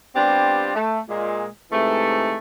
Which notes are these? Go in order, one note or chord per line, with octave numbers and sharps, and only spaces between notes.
G3 B3 C4 D4 F4 G4
A3
A#2 G#3
G#2 C3 E3 A3